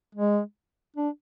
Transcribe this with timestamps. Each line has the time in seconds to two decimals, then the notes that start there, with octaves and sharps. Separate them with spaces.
0.15 G#3
0.97 D4